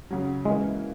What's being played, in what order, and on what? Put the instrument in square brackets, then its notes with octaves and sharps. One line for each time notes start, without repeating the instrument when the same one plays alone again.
[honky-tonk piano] F#2 C#3 F#3
[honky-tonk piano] E3 A#3 C#4 E4 [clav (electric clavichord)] G#3